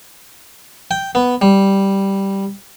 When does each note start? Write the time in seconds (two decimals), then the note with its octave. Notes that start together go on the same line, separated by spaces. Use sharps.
0.91 G5
1.15 B3
1.42 G3